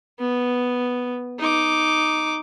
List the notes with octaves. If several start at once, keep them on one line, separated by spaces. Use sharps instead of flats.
B3
D#4 D6